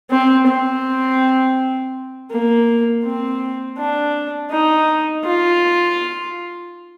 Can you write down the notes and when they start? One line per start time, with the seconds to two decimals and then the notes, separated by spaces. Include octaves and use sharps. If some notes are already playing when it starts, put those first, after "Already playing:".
0.11 C4
0.47 C4
2.31 A#3
3.04 C4
3.78 D4
4.51 D#4
5.25 F4